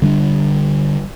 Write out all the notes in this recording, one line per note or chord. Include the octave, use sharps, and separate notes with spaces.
D3 G3 A3 D4